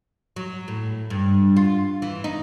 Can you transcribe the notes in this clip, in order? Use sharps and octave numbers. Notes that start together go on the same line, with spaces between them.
F#3
A2
G2
F4
E3
D#4